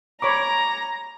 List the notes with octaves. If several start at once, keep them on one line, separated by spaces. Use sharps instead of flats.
C#5 A#5 B5 D6